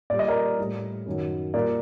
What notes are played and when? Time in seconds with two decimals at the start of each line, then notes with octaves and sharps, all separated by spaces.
0.10 A#2 G3 D5
0.19 D#5
0.28 A#4 D5
0.58 A2 G3
1.06 F#2 D#3 F#3
1.54 A#2 G3 A#4 D5